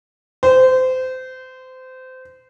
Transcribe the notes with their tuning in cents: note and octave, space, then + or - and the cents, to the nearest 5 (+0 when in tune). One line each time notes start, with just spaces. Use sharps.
C5 -25